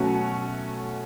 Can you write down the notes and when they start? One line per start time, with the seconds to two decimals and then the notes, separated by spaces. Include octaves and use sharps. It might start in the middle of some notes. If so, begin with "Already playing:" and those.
Already playing: B2 F#3 A3 C#4 F#4